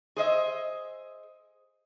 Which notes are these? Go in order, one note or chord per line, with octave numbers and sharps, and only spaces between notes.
G#4 C5 D#5 E5